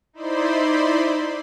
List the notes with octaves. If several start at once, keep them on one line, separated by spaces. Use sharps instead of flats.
D#4 E4 C5 D5 B5 C6